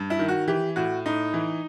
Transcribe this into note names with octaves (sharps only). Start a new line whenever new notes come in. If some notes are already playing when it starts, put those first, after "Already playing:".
Already playing: G2
E4
D#3
F#4
E3 G4
A2 F#4
A2 D#4
E3